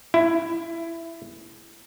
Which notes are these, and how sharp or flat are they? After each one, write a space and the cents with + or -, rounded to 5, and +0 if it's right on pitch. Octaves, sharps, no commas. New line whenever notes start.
E4 +15